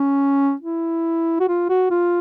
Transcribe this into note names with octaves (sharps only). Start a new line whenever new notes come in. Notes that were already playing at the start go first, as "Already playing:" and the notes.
Already playing: C#4
E4
F#4
F4
F#4
F4